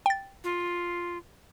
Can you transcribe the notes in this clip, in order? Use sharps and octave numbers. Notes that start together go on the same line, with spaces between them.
G5 A6
F4